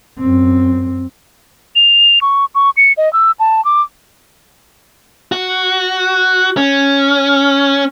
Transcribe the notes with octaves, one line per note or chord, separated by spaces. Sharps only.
F#2 C4
F7
C#6
C#6
C#7
D#5
E6
A5
D6
F#4
C#4